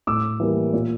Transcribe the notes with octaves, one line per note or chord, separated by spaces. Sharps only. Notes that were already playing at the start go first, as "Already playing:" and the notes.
A2 D6 E6
E3 G3 A#3
A#2